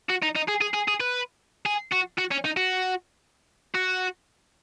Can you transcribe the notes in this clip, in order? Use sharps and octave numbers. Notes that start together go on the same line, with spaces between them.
F#4
D#4
D#4
G#4
G#4
G#4
G#4
B4
G#4
F#4
F#4
C#4
D#4
F#4
F#4